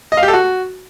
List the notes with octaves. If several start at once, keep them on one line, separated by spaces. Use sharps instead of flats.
D#5
F5
G4
A4
F#4